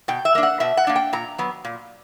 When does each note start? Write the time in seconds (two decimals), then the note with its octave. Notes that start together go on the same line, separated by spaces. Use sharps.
0.08 B2 G5
0.25 E5
0.35 A#3 D4
0.43 F#5
0.60 B2 E5
0.77 F#5
0.87 A#3 D4
0.96 G5
1.13 A#2 A#5
1.38 F#3 B3
1.65 A#2